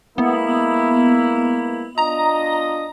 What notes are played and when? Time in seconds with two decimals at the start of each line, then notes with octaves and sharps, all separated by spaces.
0.18 G#3 A#3 B3 E4
1.98 D4 F4 D#5 A#5